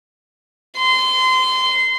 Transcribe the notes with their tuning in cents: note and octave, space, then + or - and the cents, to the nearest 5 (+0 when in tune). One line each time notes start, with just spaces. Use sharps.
C6 -25